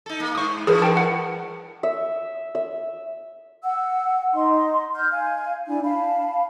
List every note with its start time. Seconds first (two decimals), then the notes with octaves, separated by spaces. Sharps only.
0.06 D#4 A4
0.20 A#3
0.35 G#2 C5 C#6 D#6
0.67 G2 E3 G#4 A#4 B4
0.82 A#4 G5 A5
0.97 F#5
1.83 E5
2.55 E5
3.63 F#5 E6
4.34 D#4 D#5 C6
4.95 F6 G6
5.12 F5 G#5
5.67 D4 E4 G#5
5.84 F5 A5 B5